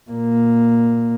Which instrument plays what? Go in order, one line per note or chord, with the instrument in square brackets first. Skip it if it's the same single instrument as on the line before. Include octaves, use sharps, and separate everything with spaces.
[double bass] A#2 A#3